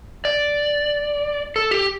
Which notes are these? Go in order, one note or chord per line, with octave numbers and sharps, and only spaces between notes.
D5
A4
G4